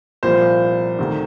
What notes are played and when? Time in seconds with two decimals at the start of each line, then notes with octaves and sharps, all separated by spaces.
0.23 C2 A#2 F3 C5
0.99 D2 C3 D#3